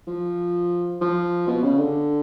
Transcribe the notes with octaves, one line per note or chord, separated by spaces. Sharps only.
F3
F3
B2
C#3
D3